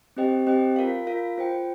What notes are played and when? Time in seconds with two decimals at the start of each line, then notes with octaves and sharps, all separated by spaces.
0.17 C4 G4 C5 D#5 G5
0.47 C4 G4 C5 D#5 G5
0.76 F4 A#4 F5
1.07 F4 A#4 F5
1.38 F4 C5 G5